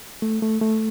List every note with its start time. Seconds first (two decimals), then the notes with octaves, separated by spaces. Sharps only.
0.22 A3
0.42 A3
0.61 A3